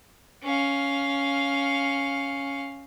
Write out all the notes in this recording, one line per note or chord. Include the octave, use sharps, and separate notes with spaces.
C#4 F5